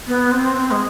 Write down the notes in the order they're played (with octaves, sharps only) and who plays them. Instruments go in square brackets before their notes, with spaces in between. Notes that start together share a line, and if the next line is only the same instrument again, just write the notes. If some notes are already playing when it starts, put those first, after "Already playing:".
[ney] B3
C4
C4
G#3